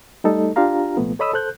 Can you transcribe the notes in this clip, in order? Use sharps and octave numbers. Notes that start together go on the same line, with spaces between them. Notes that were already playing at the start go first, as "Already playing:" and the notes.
G3 A3 D#4 A4 D#5
D4 F4 G4 F5 A#5
C2 A#2 F3 A3 B3
A4 C#5 D#5 B5 D#6 E6
A4 C5 F#6 G6